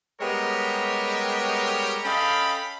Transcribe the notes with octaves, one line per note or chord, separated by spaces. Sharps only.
G3 G#3 B3 G4 A#4 C#5
C#4 A4 D#5 F5 G5 B5